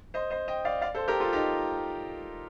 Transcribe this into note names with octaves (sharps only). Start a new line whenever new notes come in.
C5 D#5
C5 D#5
D#5 G5
D5 F5
D5 F5
A4 C5
G4 A#4
F4 A4
D#4 G4